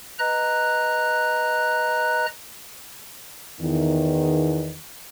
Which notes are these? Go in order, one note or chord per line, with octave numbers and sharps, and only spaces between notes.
B4 D#5 A#5 F#6
E2 D#3